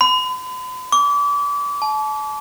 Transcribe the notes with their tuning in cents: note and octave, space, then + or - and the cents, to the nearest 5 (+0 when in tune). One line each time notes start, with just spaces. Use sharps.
B5 +45
D6 -35
A5 -35